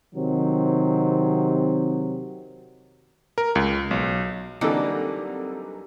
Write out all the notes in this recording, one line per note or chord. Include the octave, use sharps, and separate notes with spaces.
C3 D#3 F#3 C4
A#4
C#2
B1
D3 E3 F#3 G3 A#3 C4 D#4 A4